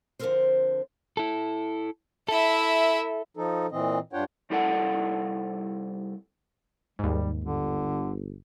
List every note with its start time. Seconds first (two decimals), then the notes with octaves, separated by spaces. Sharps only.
0.19 D3 F3 C4 A4 A#4 C5
1.17 E4 A4
2.28 E4 A4 E5
3.37 F3 D#4 A4
3.71 A#2 E3 C4 D#5
4.13 G2 D4 F4 C#5 F#5 G5
4.50 C2 G3 E4 A4 D5 F#5
6.99 D#2 G#2 G3
7.44 G1 D3